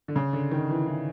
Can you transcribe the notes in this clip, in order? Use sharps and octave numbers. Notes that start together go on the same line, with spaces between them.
D3
C#3
D3
D#3
E3
E3